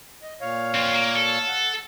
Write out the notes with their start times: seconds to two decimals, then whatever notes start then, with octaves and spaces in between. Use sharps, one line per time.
0.22 D#5
0.41 A#2 C#5 F5
0.74 C4 F4
0.93 A#3
1.15 A4
1.47 F#5